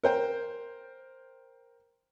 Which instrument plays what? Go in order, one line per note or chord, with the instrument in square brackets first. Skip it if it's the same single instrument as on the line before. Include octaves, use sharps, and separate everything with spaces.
[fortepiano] A#4 C5 G5